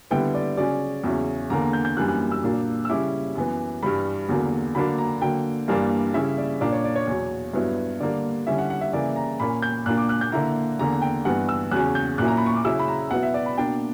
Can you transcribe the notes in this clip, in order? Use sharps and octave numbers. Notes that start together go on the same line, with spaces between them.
D3 G3 B3 E4 G5
D5
C#3 F#3 C#4 D5
E2 C#3 F#3 C#4 E4
E2 D3 A#3 D4 A#5
A#5
G6
G6
F#2 E3 G3 A#3 D4 F#6
F#6
E6
A#2 F#3 A#3 D4
E6
C#3 G3 C#4 E4 D6
F#2 E3 B3
G2 E3 G3 B5
E2 D3 F#3 A#3
D3 F#3 A#3 D4 B5
A#5
D3 F#3 A#3 G5
G2 E3 G3 A#3 D4
C#3 G3 C#4 E4 E5
D5
A#2 A#3 D4 D5
C#5
D5
C#5
E2 B2 F#3
G2 F#3 B3 E4
D3 G3 A#3 D4 D5
D3 G3 C#4 E4 E5
F#5
F#5
E5
C#3 E3 A#3 E4 D5
A#5
A#2 A#3 C#4 B5
G6
A#2 A#3 D4 F#6
D6
F#6
G6
D3 A#3 E4 A#5
E2 D3 A#3 A#5
G5
G2 E3 B3 F#5
E6
E2 C#3 F#3 C#4 F#6
G6
A#2 F#3 A#3 C#4 E4 F#6
A#5
B5
C#6
D6
C#3 F#3 C#4 E4 E6
B5
A#5
B2 F#3 B3 E4 F#5
E5
D5
B5
B2 A#3 D4 G5